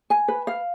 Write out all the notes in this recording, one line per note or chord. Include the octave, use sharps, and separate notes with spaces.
G#5
B4
F5